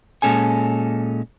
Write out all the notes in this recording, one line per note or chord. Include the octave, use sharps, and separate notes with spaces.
A#2 G#3 C#4 A4 G#5